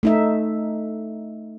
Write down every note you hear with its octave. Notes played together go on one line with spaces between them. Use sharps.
A3 D#4 E5